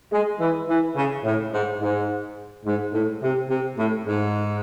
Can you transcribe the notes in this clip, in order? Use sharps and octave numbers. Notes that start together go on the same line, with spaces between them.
G#3
E3
E3
C#3
A2
G#2
G#2
G#2
A2
C3
C3
A2
G#2